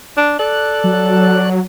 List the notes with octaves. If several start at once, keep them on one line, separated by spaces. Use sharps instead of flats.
D4
A4 D5 F#6
F#3